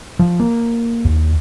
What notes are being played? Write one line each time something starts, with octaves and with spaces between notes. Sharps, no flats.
F3
A#3
D#2